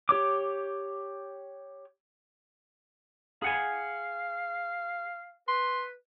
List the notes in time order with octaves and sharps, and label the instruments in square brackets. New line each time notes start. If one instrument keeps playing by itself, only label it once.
[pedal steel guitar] G4 C#5 D6
[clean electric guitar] G#4 F#5 G#5 [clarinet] F5
[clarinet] B4 [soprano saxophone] C6